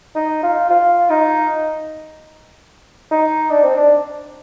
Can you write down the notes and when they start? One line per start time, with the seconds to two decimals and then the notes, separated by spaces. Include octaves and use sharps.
0.16 D#4
0.43 F4
0.70 F4
1.10 D#4
3.11 D#4
3.51 D4
3.63 C4
3.77 D4